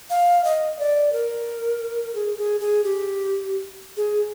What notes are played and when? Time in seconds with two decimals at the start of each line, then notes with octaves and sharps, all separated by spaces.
0.10 F5
0.44 D#5
0.79 D5
1.12 A#4
2.15 G#4
2.38 G#4
2.60 G#4
2.84 G4
3.97 G#4